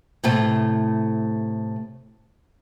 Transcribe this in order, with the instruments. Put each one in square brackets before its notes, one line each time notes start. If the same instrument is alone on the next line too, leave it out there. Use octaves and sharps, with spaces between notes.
[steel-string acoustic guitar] A2 C3 A3